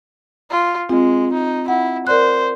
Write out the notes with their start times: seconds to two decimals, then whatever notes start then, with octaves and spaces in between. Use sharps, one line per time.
0.51 F4
0.89 G#3 C4 F4
1.32 D#4
1.68 E4 F#5
2.07 A#4 C5 D5 F#6